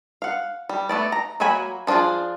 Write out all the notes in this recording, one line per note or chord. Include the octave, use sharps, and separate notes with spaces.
F5 F#5
G3
A3 B3 D5
A#5
F#3 A#3 F#4 G#5 B5
F3 D4 D#4 F4 G#4